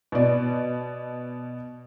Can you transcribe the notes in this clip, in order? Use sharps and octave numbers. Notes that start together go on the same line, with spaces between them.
B2 D5